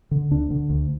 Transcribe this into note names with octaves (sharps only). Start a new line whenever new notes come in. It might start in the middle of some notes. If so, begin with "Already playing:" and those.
D3
D2 D4
D3
D2